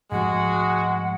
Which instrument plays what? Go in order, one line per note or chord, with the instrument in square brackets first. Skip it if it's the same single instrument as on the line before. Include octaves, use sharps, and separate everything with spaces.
[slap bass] G#2 F3 A3 [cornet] G#3 [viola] F#4 [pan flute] F#5